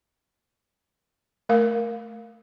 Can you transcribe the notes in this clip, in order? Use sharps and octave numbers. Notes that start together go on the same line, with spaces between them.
A3 A#4 F5